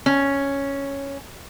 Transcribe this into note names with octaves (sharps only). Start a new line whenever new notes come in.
C#4